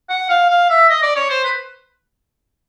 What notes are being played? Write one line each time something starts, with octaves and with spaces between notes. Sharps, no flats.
F#5
F5
F5
E5
D#5
D5
C#5
C5
B4